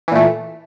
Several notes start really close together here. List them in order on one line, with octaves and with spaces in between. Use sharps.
E3 A#2 A3